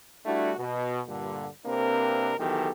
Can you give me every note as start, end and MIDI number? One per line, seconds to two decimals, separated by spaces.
0.26 0.52 55
0.26 0.52 57
0.26 0.52 62
0.26 0.52 64
0.26 0.52 66
0.58 1.00 47
1.07 1.47 43
1.07 1.47 46
1.07 1.47 50
1.65 2.33 48
1.65 2.33 58
1.65 2.33 60
1.65 2.33 62
1.65 2.33 70
1.65 2.33 71
2.38 2.71 35
2.38 2.71 47
2.38 2.71 51
2.38 2.71 52
2.38 2.71 67
2.38 2.71 69